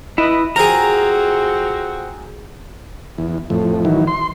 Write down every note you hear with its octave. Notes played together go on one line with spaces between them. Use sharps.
E4 B4 D#5
F2 C4 F#4 G#4 A#4 A#5
E2
F2 A2
D#3 E3 F#3
C6